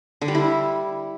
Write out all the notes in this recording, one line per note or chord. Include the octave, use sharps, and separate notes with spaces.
D3
G3
E4